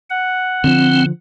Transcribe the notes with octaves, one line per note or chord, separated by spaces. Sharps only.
F#5
D3 F3 C4